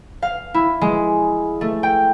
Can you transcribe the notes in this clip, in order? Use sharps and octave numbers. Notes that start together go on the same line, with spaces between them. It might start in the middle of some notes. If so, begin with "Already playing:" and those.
F5
E4
G#3
A3
G5